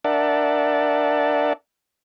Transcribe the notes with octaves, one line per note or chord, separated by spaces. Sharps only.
D4 A#4 D5 E5 F#5 A5